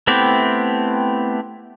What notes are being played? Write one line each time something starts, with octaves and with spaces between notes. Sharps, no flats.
A3 B3 C4 E4 G4